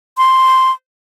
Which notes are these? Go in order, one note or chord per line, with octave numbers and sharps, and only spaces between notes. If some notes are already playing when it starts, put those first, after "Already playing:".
C6